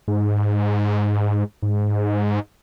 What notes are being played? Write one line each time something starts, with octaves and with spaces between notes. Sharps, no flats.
G#2
G#2